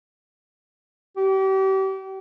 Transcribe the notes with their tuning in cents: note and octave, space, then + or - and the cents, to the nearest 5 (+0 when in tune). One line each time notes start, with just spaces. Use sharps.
G4 -35